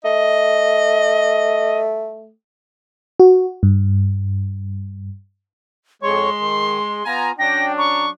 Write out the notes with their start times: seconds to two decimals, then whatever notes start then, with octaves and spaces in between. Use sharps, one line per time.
0.05 A3 D#5
3.20 F#4
3.63 G2
6.03 F2 G#3 C#5 C6 C#6
6.39 D#3
7.06 B3 F4 G#5 A#5
7.39 F#3 C#4 D4 G5 A#6
7.78 A#5 C#6